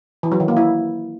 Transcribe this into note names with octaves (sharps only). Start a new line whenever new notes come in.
E3
F#3
D#3
A#3
E4